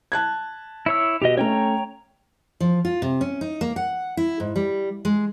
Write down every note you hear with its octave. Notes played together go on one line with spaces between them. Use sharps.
A5 F#6 G#6
E4 C#5 E6
B2 G4 D#5
A3 C#4 C#5 G5 A#5
F3
F4
C3
C#4
D#4
A#3
F#5
E4
G#2
G3
G#3